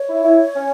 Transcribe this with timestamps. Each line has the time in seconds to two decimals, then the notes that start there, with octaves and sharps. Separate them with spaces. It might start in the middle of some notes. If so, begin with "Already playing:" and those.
Already playing: C#5
0.09 E4
0.24 E4
0.56 C#4